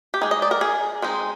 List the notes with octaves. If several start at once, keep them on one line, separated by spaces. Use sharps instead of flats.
G4
G#3 D#4 G#4
D#5
D5
A#4
G#4
G#3 C4 D#4